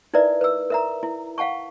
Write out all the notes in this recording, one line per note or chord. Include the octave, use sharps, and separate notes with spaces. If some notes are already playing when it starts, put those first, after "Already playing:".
D#4 E4 A#4 B4 D5 E5
B4 E6
A#4 E5 A#5
E4
F5 F#5 A5 C#6